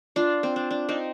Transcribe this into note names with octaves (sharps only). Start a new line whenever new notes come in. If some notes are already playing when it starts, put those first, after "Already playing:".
D4 F4
C4
D4
D4
C4 D#4